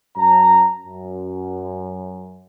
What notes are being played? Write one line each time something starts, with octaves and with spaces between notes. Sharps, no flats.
F#2 C#4 A5 A#5
F#2